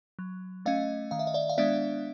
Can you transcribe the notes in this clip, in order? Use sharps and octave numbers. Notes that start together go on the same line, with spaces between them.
F#3
A3 C#4 D#5 F5
D#3 F5
E5
D#5
D5 E5
F5
G#3 B3 D4 D5 E5